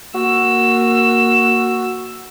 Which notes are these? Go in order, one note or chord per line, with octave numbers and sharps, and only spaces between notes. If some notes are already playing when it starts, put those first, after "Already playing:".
A#3 F#4 E6